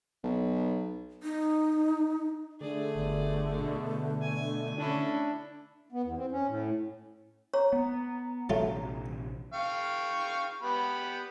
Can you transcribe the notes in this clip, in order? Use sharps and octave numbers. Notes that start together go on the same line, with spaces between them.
B1
D#4
D3 A3 G#4 D5
G1
B2
G#5
C#4 D4 E4
B3
E2
C4
C#4
A2
C#5 A#5
B3
A#1 C3 F#3 A3 F4
F5 G5 C#6
B3 G4 B5